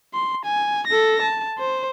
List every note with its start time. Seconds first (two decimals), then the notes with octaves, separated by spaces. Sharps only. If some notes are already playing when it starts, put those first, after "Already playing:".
0.14 C6
0.45 G#5
0.87 A4 A#6
1.22 A5
1.58 C5